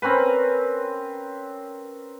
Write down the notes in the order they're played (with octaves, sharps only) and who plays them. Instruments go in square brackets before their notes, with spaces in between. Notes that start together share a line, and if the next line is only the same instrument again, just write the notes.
[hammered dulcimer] C4 C#4 A#4 B4